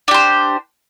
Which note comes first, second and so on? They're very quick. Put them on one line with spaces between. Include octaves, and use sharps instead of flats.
D4 G4 C5